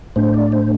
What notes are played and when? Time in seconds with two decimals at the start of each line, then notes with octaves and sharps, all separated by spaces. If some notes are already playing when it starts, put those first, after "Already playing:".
0.16 A2 A3 D4 C5
0.34 D5
0.52 C5